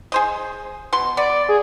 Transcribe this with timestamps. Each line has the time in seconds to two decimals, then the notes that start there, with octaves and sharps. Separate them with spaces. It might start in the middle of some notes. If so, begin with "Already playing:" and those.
0.12 G#4 C5 D#5
0.93 B2 C6
1.17 B3 D5
1.49 G#4